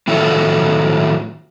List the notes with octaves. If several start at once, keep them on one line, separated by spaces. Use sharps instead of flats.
A2 D#3 F#3 E4 F4 A4